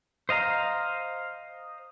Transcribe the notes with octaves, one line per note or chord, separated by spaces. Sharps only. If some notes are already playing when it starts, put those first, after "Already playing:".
C5 D#5 F5 A#5